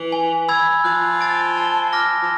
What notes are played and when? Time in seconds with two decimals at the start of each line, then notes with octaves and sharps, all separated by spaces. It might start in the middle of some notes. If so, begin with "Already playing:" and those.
Already playing: E3
0.12 G#5
0.48 B5 E6 G#6
0.84 F3 F#6
1.21 A6 D7
1.57 A5
1.93 D6 F6 A#6
2.22 F3